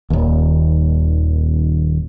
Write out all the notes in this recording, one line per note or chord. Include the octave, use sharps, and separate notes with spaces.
D#1 D#2